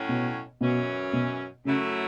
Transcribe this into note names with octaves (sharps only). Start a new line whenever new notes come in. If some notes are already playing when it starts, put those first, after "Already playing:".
Already playing: A2 F#3 C#4
B2
F#2 B2 E3 C#4
B2
F#2 C#3 F#3 A3 E4